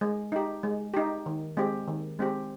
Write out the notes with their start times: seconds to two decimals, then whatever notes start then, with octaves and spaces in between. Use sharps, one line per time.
0.01 G#3
0.32 D#4 G4
0.63 G#3
0.94 D#4 G4
1.26 D#3
1.57 G#3 C4 G4
1.88 D#3
2.19 G#3 C4 G4